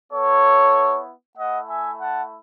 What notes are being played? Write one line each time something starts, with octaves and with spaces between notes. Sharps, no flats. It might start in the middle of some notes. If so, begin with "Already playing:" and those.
B3 E4 A4 C#5
A3 E4 D#5 F#5
E5 G#5
F#5 A5